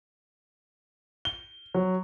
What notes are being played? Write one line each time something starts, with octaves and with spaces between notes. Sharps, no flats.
G7
F#3